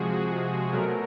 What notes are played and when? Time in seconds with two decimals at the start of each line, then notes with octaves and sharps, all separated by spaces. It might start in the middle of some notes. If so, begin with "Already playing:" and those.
Already playing: C3 F3 G#3 F#4 G#4
0.13 F#4
0.72 B2 F#3 A3 A#4